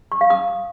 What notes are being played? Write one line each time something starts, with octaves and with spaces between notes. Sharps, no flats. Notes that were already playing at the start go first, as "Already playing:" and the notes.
C#6
F5
D#6